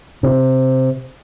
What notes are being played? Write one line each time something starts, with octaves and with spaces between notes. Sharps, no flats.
C3